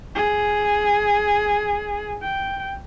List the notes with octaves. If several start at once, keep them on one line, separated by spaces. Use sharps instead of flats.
G#4
G5